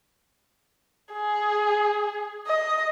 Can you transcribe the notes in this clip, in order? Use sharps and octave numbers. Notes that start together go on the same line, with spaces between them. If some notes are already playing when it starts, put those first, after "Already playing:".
G#4
D#5